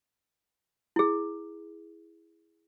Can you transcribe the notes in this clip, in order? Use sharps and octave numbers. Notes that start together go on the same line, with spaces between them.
E4 G#4